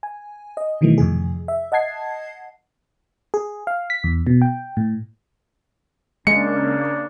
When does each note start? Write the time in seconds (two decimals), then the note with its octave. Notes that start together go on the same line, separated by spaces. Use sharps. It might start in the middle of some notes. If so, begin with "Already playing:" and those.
0.03 G#5
0.57 D#5
0.81 B2 D#3 E3 F#3 A3
0.98 F2 A2 C3 G#4
1.48 E5
1.72 D#5 F#5 A5 G#6 C7
3.34 G#4
3.67 F5
3.90 B6
4.04 E2
4.27 B2
4.42 G5
4.77 A2
6.27 C#3 G#3 A#3 D4 C#7